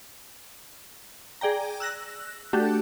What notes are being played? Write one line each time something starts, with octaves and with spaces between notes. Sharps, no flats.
G#4 D5 G5 A#5
E6 F#6 A#6
A3 D4 F#4 G4 A4